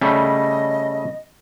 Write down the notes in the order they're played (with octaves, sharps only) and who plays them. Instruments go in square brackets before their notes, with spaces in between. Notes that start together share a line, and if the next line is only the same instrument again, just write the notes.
[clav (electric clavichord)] C#3 G3 A3 [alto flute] D#5